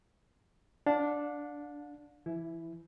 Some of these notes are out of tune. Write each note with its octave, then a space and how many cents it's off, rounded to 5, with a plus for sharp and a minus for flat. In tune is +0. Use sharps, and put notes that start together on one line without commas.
D4 +0 F5 +45
E3 +35 E4 +0